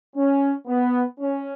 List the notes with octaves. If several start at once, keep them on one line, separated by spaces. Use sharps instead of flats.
C#4
B3
C#4